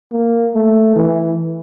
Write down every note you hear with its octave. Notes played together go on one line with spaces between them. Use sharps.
A#3
A3
E3